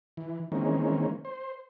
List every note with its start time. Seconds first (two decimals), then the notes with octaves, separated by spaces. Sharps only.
0.17 E3
0.52 D#3 E3 G#3 A#3 C4 C#4
1.25 C5